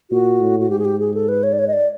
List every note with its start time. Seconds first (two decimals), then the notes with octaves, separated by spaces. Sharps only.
0.11 A#2 F#4
0.41 A2
0.60 F#4
0.70 G#2 G4
0.79 G#4
0.85 G4
1.00 G#4
1.14 A4
1.28 B4
1.43 C#5
1.53 D5
1.59 C#5
1.68 D#5
1.73 D5